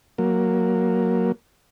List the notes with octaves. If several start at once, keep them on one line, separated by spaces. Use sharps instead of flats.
F#3 A#3